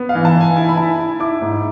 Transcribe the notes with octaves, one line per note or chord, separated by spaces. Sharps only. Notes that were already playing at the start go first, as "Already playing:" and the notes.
Already playing: B3
F5
E3
A5
E3 G#5
E4 G#5
B5
E4 A5
E4
E4 D6
G#2